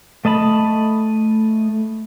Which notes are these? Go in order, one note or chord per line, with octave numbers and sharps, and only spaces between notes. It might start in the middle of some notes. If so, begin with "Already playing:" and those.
A3 D#5 A5 B5